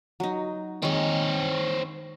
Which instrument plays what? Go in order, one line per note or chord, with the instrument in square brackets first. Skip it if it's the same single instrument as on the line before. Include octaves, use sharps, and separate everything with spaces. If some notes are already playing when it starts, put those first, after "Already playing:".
[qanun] F#3 D#4
[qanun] D#3 G#3 [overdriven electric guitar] C4 C#5